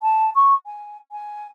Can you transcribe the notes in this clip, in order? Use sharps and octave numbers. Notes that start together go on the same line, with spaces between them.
A5
C#6
G#5
G#5